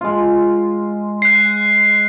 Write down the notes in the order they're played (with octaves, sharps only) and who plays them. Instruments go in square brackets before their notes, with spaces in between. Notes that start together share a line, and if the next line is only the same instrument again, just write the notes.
[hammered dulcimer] G#3 F4
[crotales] F#6 C7